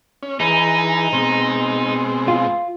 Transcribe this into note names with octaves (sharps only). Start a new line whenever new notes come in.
C#4
E3 D#4 G#4 B4
B2 G#3 C4
F4